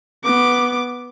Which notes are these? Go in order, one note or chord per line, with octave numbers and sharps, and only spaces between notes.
B3 D6